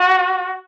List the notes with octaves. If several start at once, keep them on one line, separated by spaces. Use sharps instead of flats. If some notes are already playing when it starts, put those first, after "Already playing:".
Already playing: F#4